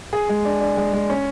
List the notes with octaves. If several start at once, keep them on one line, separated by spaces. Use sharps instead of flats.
G#4
G#3
D4
D4
G#3
G#3
C#4